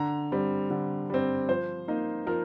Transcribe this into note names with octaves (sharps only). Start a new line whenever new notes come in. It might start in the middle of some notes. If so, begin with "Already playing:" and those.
Already playing: D3 A#5
G3 C4
D3
G3 C4
F3 C5
A#3 D#4
F3 A#4